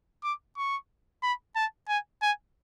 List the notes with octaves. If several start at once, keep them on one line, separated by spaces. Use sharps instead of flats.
D6
C#6
B5
A5
G#5
G#5